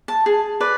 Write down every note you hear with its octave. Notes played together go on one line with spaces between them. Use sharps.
A5
G#4
B4 D5